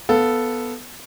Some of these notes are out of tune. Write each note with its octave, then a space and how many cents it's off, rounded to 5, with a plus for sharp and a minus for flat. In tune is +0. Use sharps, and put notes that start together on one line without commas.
B3 +0 A4 +0 F5 +0